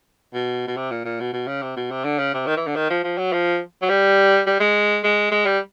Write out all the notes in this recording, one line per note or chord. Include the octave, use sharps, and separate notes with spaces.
B2
B2
C3
A#2
A#2
B2
B2
C#3
C3
B2
C3
D3
C#3
C3
D#3
E3
D3
D#3
F3
F3
F#3
F3
F#3
G3
G3
G#3
G#3
G#3
G3